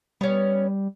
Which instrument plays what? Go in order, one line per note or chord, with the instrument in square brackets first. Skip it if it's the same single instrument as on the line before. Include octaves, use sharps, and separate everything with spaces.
[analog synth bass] G3 [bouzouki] B3 C#4